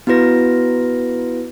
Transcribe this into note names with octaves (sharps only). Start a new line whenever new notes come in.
B3 E4 F#4 B4 A#6